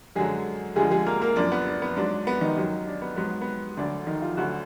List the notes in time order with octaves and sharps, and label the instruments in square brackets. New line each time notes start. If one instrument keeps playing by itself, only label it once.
[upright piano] F#2 D3 F#3 G#3 G#4
D2 D3 F3 G#3 G#4
G#3 G#4
A#3 A#4
A#3 A#4
F#2 F3 D4
B3
D4
B3
G#2 F#3 D4
B3
D#3 D#4
F#2 D#3 F#3
D4
B3
G#2 F#3 B3
B3
D2 D3 F#3 D4
D#3 D#4
F3 F4
D2 D3 F#3 F#4